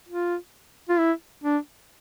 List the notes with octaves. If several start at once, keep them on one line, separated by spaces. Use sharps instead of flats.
F4
F4
E4
D4